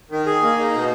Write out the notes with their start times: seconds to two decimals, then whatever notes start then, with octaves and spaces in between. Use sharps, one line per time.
0.11 D#3
0.26 G#4
0.42 A#3
0.58 D#4
0.74 B2